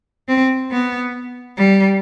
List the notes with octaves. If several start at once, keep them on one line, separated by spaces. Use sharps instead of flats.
C4
B3
G3